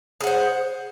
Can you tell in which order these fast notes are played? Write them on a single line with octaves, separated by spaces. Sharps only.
G#4 F#5 C5